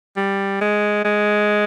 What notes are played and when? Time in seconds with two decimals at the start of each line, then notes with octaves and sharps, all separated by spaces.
0.17 G3
0.61 G#3
1.04 G#3